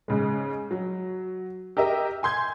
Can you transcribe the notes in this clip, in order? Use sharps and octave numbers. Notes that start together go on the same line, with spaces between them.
G#2 C#3 G#3
F#3
G4 A#4 D#5 E5
G#5 C6 G6 G#6